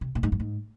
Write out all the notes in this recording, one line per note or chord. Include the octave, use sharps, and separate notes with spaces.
C3
A#2
G#2
G2
G#2